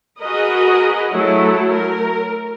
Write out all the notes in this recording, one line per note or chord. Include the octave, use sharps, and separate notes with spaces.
F#4 G#4 A#4 B4 D#5
F#3 A3 E4
A#4